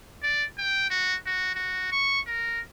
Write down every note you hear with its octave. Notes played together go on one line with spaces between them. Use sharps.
D5
G5
F#4
F#4
F#4
C#6
A#4